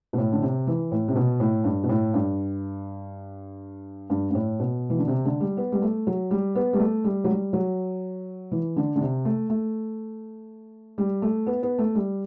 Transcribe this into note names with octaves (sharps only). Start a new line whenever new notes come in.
B2
A2
D3
C3
E3
A2
C3
B2
A2
G2
B2
A2
G2
G2
G2
A2
B2
E3
D3
C3
D3
G3
B3
G3
A3
F#3
G3
B3
G3
A3
G3
F#3
G3
F#3
E3
D3
D3
C3
A3
A3
G3
A3
B3
B3
A3
G3